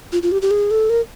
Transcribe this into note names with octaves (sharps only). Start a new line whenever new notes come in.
F4
F4
G4
G4
G#4
A4
A#4